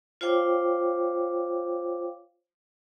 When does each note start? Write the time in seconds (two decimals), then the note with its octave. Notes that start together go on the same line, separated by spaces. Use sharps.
0.21 F4 C5 C#5 F5 G5 D6